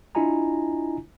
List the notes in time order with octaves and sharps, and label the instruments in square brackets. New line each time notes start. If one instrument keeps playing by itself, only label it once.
[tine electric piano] D4 E4 F4 D#5 G#5 A#5